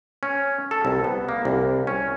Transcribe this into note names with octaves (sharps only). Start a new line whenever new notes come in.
C#4
A4
C2
B3
A#3
C2
C#4